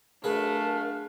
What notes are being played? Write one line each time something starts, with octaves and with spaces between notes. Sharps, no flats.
F#2 A3 D4 G#4 A#4 B4 F5